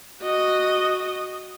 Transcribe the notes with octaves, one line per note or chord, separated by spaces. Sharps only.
F#4 D#5